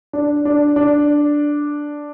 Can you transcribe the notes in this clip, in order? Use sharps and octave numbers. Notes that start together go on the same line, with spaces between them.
D4
D4
D4